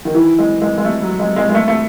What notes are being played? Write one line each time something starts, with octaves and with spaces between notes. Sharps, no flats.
D#3
E3
G#3
G#3
G#3
A3
F#3
G#3
G#3
G#3
A3
A3